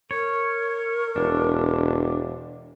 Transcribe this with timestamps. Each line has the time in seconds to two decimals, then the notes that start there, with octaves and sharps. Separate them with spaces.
0.11 A#4 C#5
1.16 E1 D4